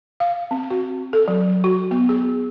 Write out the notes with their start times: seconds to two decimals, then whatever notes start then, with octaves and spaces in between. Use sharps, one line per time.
0.20 F5
0.51 C4
0.70 F#4
1.13 A4
1.28 F#3
1.64 F#4
1.91 B3
2.09 G#4